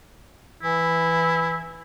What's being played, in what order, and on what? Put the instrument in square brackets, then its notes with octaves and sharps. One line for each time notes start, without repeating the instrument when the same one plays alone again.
[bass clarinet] E3 [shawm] E4